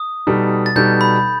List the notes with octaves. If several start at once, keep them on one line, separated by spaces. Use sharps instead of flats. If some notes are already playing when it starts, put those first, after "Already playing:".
Already playing: D#6
B2 G3 D#4 A4
A6
B2 G3 D#4 A4 G6
B5